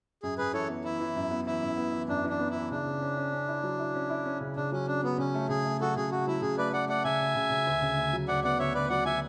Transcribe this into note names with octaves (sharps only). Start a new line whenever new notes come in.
F#2 G#4
F#2 G#4 B4
E3 A4 C#5
B3
E3 E4
E3
F#2
B3
E3 E4
F#2
B3
E3
F#2 D4
E3
D4
B3
E3 E4
C#3 D4
C#3
C#4
C#4
C#4
E4
F#3
E4
C#4
E4
C#4
C#3
C#3 D4
F#3 C#4
C#4 D4
F#3 B3
C#3 C#4
A3
C#3 G#4
A3
F#3 F#4 A4
C#3 G#4
A3 F#4
F#3 E4
C#3 G#4
A3 B4 D5
A3 D5 F#5
A3 D5 F#5
C#3 E5 G#5
C#3
C#3
C#3
D2
C#3
D2
F#3
D2 D5 F#5
B3 D5 F#5
D2 C#5 E5
D2 B4 D5
F#3 D5 F#5
F#3 E5 G#5